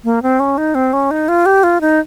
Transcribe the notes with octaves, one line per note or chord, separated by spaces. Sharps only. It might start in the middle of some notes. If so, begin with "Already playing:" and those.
A#3
C4
C#4
D#4
C4
C#4
D#4
F4
G4
F4
D#4